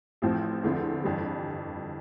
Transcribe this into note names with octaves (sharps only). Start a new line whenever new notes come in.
A1 A2 F3 C4
E2 D3 F3 C4 E4
G1 F2 E3 G3